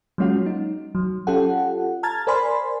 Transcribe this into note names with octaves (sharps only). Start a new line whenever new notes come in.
F#3 G#3 A#3 C#4 F4 F#4
D#4
F#3
C#4 F4 G4 A4 F#5
A5 A#5 F6 G#6 A6
A#4 C5 D5 G#5 B5 C6